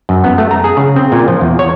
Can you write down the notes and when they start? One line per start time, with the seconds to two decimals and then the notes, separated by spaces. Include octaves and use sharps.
0.09 F#2
0.24 B3
0.38 A3
0.51 A#5
0.64 G#4
0.77 C#3
0.96 C4
1.12 A#2
1.28 F3
1.41 E2
1.59 C#5